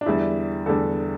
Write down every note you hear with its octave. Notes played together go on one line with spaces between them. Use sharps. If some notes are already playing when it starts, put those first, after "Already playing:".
D4
E2 D3 G3 E4
E2 D3 G3 A4